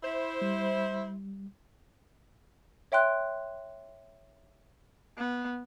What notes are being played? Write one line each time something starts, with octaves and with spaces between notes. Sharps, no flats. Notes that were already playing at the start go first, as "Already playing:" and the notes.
E4 C5
G3
C#5 E5 G5 C6 F#6
B3